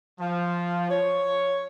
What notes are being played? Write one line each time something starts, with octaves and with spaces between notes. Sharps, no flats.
F3
C#5